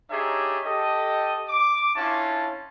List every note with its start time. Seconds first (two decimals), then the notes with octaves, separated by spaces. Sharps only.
0.11 D4 D#4 G4 G#4 C#5 E5
0.66 G4 A4 D#5
1.49 D6
1.96 C#4 D4 E4 F4 C#5 A5